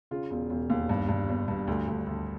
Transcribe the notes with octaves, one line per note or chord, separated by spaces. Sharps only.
C#3 F4
E1
E1
D#2
G2
G2
G1
G2
D2
D2
D2